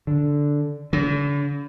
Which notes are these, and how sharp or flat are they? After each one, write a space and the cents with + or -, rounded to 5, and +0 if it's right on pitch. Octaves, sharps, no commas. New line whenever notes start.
D3 -5
D3 -45